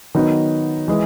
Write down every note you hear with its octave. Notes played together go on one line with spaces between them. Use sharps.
D#3 F#3 B3 D#4
E3 G#3